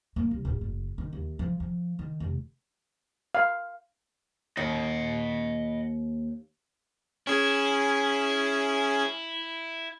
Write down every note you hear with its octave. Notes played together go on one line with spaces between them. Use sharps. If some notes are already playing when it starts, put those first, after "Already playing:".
A#3
C2
D1
F#1
D#3
D#2
F3
F3
D#3
F1
F5
D#2 D#5 F#5
C#4 E4 G#4